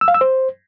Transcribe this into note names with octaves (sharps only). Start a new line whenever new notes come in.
E6
F5
E6
C5